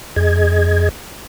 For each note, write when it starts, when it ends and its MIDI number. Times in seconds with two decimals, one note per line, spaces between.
0.16 0.89 41
0.16 0.89 68
0.16 0.89 75
0.16 0.89 92